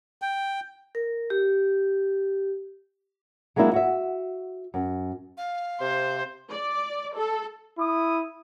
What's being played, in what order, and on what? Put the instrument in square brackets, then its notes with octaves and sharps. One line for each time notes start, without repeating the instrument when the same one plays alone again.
[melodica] G5
[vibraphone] A#4
G4
[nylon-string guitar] F#3 G#3 A#3 D4 E4
F#4 E5
F#2
[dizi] F5
[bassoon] C3 [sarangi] C5
[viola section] D5
A4
[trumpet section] E4 D#6